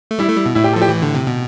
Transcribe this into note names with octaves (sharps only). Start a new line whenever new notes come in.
A3
G3 E4
A3
G3
B2
A2 E4
G4
A4
F3
G4
E3
D3
C3
B2